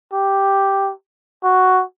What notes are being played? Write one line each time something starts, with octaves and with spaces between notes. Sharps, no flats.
G4
F#4